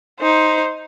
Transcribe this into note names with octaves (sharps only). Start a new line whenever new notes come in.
D#4 C5